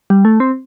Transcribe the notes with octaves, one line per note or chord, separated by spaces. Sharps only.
G3
A3
C4